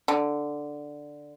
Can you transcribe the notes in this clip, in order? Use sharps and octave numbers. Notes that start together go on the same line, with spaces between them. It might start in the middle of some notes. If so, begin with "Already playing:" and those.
D3